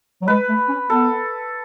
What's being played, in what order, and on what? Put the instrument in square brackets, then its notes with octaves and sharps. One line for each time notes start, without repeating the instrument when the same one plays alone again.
[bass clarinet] F#3
[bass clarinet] G#3 [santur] B4
[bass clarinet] A3
C#4
[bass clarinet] B3 [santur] A4